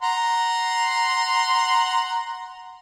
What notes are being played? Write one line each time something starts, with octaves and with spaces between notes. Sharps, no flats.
F#5 A#5 C6